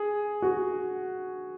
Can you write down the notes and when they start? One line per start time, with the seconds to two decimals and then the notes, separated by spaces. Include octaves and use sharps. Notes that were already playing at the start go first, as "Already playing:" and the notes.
Already playing: G#4
0.42 F#4